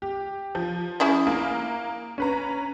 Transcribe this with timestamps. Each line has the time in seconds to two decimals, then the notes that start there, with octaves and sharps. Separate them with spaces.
0.02 G4
0.55 F3
1.00 C#4 E4 G#4
1.27 A#3
2.18 C#4 B4 A#5